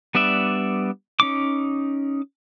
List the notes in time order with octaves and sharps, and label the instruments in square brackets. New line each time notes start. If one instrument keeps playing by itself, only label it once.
[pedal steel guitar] G3 B3 D4 D5 E5
C#4 D#4 D6